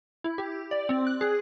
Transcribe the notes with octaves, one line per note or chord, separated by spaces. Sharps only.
E4
G4
D5
C4
F#6
G#4